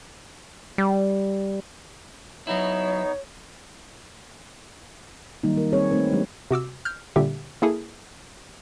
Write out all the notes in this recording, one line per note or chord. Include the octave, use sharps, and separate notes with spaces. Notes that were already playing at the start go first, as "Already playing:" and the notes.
G3
F#3 B3 D#4 E4 C#5
D#3 F#3 G3 A#3 D#4
A#4
G3 C4 G#4 C#5
A3 C4 D#4 B4
F#3 G#3 D4 G4
C3 F#4 D6 E6
F6 G6
A#2 D3 G3 G4 E5
A#3 E4 G#4 A4